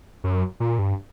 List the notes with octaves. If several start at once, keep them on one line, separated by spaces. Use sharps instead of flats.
F#2
A#2
G2